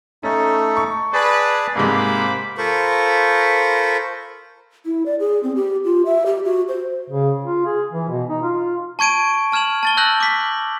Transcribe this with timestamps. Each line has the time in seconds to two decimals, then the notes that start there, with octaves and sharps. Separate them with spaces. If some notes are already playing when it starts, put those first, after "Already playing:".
0.23 A3 C#4 D#4 A4
0.77 C#6
1.13 G#4 B4 D5 A5
1.76 G#2 C3 G#3 A#3 C5 B5 D6
2.58 F4 A4 A#4 C5 B5 C#6
4.86 E4
5.06 D5
5.20 G#4
5.43 C4
5.56 G4
5.85 F4
6.06 E5
6.26 G4
6.45 F#4
6.68 C5
7.10 C#3
7.45 F4
7.65 G#4
7.93 E3
8.09 B2
8.29 D#4
8.42 F4
8.99 A5 C#6 G#6 D7 D#7
9.52 A5 F6 G#6 E7 F#7
9.83 A5 A6 G7
9.97 A5 E6 F#6 G6 A#6 F#7
10.20 D6 B6